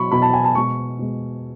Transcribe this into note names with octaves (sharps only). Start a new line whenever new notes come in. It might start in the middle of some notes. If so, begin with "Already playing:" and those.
Already playing: B2 F#3 B5 C#6
B2 F#3 B5
A5
G#5
A5
B2 G#3 C#6
B2 G#3